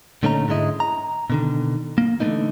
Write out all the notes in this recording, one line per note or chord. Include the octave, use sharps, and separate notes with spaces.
A#2 D3 A3 C#4 D#4 A#5
G#2 D3 G#3 E4 D#5
A#5
B2 D3 D#3
A#3
D3 E3 F3 A3 A#3 D#4